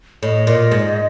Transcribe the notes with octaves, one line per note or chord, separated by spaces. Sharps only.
A2 D#5
A#2
G#2